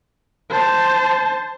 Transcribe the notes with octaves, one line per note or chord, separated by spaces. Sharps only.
C5 A5